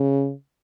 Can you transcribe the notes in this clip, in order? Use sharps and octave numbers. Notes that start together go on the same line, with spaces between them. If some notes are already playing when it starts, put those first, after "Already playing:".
Already playing: C#3